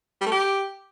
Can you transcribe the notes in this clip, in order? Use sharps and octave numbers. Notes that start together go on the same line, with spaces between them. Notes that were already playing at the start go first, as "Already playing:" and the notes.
G3
A3
G4